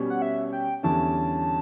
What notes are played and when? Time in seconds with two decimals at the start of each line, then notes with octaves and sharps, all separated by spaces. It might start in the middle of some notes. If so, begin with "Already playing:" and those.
Already playing: B2 G3 C#4
0.10 F#5
0.22 E5
0.52 G5
0.83 E2 D3 G3 C#4 E4 A5